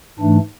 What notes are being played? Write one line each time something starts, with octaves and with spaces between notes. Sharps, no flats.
G#2 E3 A3 D4